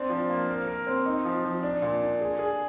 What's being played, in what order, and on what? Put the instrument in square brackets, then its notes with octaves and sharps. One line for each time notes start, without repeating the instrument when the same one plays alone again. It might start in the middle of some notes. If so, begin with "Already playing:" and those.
Already playing: [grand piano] C4 D4
F3
A#3
A#4
A#4
C4
D#4
F3
F3
D4
A#2
D4
G#4
G#4